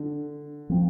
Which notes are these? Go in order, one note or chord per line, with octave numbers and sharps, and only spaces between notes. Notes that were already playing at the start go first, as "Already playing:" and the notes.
Already playing: D3
F3 C4